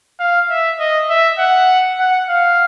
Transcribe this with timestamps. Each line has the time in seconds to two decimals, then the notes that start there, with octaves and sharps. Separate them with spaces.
0.20 F5
0.50 E5
0.79 D#5
1.09 E5
1.39 F#5
1.99 F#5
2.29 F5